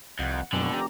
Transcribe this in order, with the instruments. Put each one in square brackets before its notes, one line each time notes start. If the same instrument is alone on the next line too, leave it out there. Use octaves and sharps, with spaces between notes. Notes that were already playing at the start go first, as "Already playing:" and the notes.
[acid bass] C2 [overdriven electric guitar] F2 [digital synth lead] F#5
[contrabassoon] F1 [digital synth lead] F#2 [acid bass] B2 [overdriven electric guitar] D3
[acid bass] G4 [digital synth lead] A#5